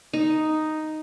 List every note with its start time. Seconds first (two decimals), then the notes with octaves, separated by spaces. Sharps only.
0.14 D#4